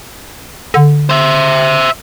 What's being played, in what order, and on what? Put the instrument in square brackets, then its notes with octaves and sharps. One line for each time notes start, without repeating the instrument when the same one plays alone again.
[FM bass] D3
[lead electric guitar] C5 E5